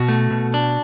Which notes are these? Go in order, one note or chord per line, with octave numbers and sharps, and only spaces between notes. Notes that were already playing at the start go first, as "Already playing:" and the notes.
Already playing: B2 F#4
A3
B2
D4